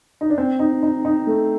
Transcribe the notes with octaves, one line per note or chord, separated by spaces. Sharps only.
D#4
D4
C4
D#4
D#4
D#4
A3